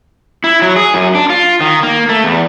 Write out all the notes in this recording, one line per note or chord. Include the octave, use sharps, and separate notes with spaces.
E4
F#3
G#4
F#2
D4
F4
D#3
A#3
A3
E2